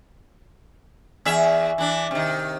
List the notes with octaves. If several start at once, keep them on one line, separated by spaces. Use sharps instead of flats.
E2 G#4 E5
E3 D4
C3 D#3